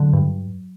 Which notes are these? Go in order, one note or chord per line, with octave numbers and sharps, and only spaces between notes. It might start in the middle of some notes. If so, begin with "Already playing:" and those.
Already playing: D3 F#3
G2